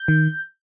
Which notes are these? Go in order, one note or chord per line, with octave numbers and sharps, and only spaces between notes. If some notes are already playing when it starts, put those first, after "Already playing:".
Already playing: G6
D#3